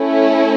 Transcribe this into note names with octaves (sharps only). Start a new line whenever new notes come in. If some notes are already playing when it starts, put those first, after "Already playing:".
Already playing: A3 C#4 E4